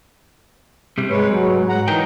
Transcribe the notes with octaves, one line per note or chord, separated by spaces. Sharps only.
C3 G3
G#2 G#3 B4 C#5
F#3
F#5 A#5
E3 D#4 A#4 G5